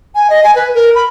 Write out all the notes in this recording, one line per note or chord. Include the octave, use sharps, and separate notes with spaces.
G#5
D#5
G#5
B4
A#4
B5